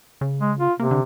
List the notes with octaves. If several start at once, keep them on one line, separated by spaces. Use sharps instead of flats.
C#3
G#3
F4
C3 A#3
D3